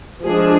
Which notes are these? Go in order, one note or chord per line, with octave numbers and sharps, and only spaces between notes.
F3 G#3 D4 G#4